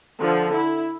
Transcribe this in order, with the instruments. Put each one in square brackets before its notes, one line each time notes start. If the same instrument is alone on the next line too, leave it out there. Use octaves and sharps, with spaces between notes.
[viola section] D3 F3
E4